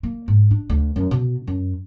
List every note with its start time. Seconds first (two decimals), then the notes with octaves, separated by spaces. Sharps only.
0.03 A#3
0.28 G#2
0.51 D4
0.70 D2
0.96 F#2
1.11 B2
1.47 F#2